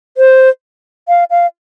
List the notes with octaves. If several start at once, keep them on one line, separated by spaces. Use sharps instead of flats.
C5
F5
F5